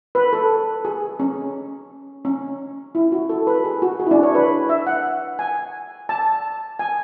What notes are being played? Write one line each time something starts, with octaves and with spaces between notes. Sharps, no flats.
B4
A4
G#4
C#4
C#4
E4
F#4
A4
B4
G#4
F#4
G#4
E4
D4
C#5
B4
E5
F#5
G#5
A5
G#5